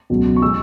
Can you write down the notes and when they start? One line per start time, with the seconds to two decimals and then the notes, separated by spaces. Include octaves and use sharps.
0.10 C#2 B2 F#3
0.36 C#6
0.42 G#3 E6